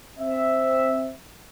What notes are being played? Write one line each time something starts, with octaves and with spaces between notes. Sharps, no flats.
C4 E5